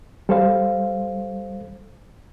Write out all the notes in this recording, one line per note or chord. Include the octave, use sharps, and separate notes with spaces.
G3 A4 C5 F5